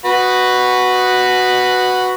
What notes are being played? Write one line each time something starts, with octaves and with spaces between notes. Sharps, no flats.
F#4 B4